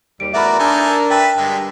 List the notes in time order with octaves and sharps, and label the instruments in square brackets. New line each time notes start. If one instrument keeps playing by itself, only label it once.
[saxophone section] D#2 G3 [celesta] D7
[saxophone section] E2 A3 A#4 [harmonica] F#4 D5 [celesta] E5 B5
[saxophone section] D4 A#4 [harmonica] D#4 A4 G#5
[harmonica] B4 E5 [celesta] G5 A5 A6
[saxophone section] G2 [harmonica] D3 G#3